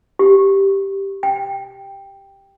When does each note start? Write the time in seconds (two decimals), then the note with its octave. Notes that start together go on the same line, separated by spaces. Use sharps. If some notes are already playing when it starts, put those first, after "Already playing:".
0.19 G4
1.23 G5